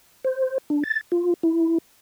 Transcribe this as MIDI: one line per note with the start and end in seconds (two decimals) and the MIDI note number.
0.24 0.58 72
0.70 0.83 62
0.84 1.01 93
1.12 1.34 65
1.43 1.78 64